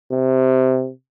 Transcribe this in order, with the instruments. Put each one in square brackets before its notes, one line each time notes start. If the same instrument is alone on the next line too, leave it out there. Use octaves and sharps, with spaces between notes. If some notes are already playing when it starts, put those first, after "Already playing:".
[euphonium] C3